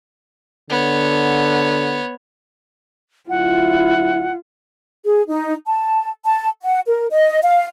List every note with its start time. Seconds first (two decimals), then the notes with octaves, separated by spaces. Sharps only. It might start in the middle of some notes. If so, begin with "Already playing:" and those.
0.70 D3 B3 C#5
3.29 D2 F#3 E4 F4 F#5
5.04 G#4
5.28 D#4
5.67 A5
6.25 A5
6.62 F#5
6.87 A#4
7.11 D#5
7.43 F5